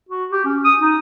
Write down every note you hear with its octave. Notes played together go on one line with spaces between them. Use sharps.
F#4
G4
C#4
D#6
D#4